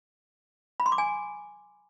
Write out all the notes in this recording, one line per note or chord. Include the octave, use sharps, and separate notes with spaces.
B5
C6
D6
G#5